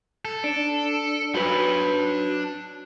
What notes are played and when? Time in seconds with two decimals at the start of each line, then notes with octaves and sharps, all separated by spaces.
0.25 A4
0.44 D4
1.35 F#3 D4 B4 B5